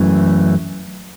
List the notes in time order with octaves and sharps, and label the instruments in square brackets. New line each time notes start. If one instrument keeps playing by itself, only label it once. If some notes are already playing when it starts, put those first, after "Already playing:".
Already playing: [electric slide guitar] F#2 E3 A3